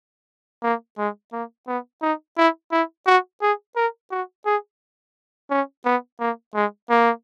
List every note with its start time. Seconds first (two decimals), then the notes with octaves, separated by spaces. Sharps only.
0.63 A#3
0.98 G#3
1.32 A#3
1.67 B3
2.02 D#4
2.37 E4
2.72 E4
3.06 F#4
3.41 G#4
3.76 A#4
4.11 F#4
4.45 G#4
5.50 C#4
5.85 B3
6.20 A#3
6.55 G#3
6.90 A#3